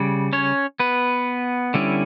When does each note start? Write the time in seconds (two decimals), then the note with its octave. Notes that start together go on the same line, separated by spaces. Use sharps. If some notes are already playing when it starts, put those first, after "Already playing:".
Already playing: C#3 G3
0.33 C#4 C#5
0.80 B3 B4
1.74 D3 G3 C#4 E4